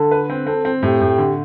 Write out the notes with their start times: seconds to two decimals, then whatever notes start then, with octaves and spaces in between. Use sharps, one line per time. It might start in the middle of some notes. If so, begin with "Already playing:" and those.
Already playing: D3 A4
0.11 B4
0.30 C4
0.47 C4 A4
0.65 C4
0.83 A2 G4
1.01 A2
1.18 D3